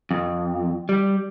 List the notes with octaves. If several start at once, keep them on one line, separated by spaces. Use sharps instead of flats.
F2
G3